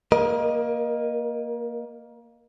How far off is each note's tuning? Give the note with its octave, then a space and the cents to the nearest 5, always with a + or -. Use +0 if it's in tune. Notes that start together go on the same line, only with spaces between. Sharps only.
A#3 +0 A#4 +30 D#5 -10